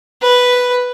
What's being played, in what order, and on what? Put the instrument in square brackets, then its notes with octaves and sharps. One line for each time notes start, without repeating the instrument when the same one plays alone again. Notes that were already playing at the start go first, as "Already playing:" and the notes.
[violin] B4